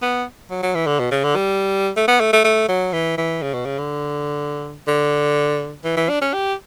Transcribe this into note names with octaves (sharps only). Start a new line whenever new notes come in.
B3
F#3
F#3
E3
D3
B2
C#3
D3
G3
A3
B3
A3
A3
A3
F#3
E3
E3
C#3
B2
C#3
D3
D3
E3
E3
D4
C#4
G4